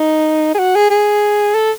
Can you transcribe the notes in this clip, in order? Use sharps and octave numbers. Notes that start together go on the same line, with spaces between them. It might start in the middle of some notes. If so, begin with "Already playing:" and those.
Already playing: D#4
G#4
F#4
G#4
G#4
A4